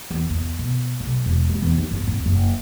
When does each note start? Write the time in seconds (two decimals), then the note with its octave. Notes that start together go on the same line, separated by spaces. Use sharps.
0.11 E2
0.30 E2
0.59 B2
1.00 B1
1.26 E1
1.50 G#3
1.62 E2
1.78 D#4
1.91 G1
2.07 D1
2.26 F#1